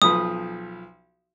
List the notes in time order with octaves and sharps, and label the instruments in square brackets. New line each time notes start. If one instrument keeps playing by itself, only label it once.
[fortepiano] B1 F3 B4 [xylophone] D#6